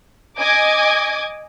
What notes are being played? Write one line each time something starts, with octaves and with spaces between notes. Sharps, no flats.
D#5 G#5 D6 G#6